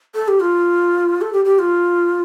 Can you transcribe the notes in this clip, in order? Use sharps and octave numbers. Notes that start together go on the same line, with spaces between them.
A4
G4
F4
A4
G4
G4
F4